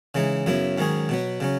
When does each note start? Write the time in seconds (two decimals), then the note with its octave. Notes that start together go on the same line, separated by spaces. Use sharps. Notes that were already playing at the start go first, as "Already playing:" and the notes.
0.15 C#3 E3 G#3 D#4
0.46 F#2 C#3 F#3 B3 E4
0.78 G#2 D#3 F#3 C#4 G#4
1.09 B2 F#3 B3
1.40 C#3 F#3 C#4